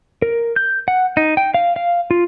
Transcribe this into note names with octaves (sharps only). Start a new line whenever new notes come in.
A#4
G6
F#5
D#4
G5
F5
F5
F4